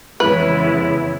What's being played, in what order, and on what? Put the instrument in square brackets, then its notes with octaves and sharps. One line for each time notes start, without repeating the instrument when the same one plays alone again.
[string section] F2 C#3 E3 [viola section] G#3 B3 [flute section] E4 C#5 [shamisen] B4